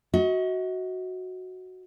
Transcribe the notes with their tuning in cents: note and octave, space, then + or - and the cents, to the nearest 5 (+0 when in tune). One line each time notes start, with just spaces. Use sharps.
F#4 +0 D#5 +40